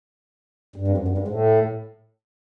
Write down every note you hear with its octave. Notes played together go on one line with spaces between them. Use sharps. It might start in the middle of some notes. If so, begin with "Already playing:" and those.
G2
F2
F#2
G2
G#2
A2